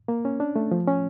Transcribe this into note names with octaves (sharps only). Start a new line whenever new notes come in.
A#3
C#4
D4
A3
F3
C#4